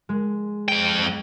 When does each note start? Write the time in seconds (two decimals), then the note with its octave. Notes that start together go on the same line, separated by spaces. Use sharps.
0.09 G#3
0.68 F2 G5